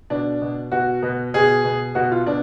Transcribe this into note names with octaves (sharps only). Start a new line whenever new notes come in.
B2 D4
B2
B2 F#4
B2
B2 G#4
B2
B2 F#4
F4
B2 D4